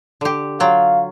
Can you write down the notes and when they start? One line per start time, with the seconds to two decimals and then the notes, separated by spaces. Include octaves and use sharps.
0.21 D3 G4
0.60 F#3 F4 F5 G5